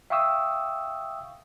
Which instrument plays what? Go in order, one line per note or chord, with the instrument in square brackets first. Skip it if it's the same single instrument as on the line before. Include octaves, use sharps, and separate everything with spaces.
[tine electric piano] E5 F5 G5 C#6 D#6 E6